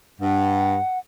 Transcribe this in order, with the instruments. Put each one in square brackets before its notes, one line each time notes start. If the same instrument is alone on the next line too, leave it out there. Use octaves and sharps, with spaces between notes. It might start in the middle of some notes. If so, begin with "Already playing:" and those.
[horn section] G2 [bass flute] F#5